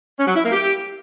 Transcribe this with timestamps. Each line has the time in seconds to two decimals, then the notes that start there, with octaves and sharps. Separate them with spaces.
0.19 C#4
0.27 F#3
0.36 E4
0.44 A#3
0.52 G4